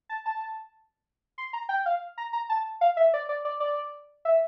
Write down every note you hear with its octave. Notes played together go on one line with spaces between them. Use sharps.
A5
A5
C6
A#5
G5
F5
A#5
A#5
A5
F5
E5
D5
D5
D5
D5
E5